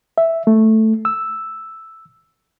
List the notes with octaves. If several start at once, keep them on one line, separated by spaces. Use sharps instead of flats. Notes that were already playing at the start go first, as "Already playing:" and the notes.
E5
A3
E6